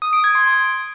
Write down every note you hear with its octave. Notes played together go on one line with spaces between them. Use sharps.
D#6
D7
G#6
C6